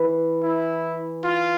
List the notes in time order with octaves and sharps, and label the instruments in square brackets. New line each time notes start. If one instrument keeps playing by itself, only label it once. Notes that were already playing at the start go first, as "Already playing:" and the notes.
Already playing: [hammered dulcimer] E3
[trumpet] E4
F4